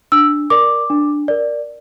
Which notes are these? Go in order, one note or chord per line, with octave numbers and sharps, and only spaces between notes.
D4 E6
A#4 D5 D6
D4
A#4 D5